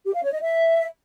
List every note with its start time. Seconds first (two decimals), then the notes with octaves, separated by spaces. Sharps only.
0.06 G4
0.15 F5
0.24 C#5
0.33 D#5
0.42 E5